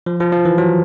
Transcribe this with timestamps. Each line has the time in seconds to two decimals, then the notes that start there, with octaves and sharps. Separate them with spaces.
0.06 F3
0.20 F3
0.32 F3
0.45 E3
0.58 F#3